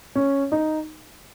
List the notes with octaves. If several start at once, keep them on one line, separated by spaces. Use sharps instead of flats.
C#4
D#4